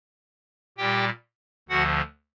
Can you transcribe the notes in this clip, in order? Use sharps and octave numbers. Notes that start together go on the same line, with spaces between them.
A#2 G3 G4 G5
D2 D3 F3 F#4 F#5